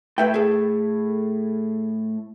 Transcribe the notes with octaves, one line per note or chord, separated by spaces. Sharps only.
A2 B4 E5 G5
G#4 A4